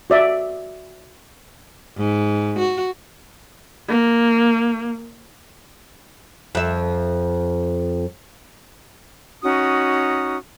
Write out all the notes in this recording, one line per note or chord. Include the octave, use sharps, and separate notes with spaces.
F#4 D5 E5
G#2
F#4
A#3
F2 E5
C#4 D#4 F#4 D#6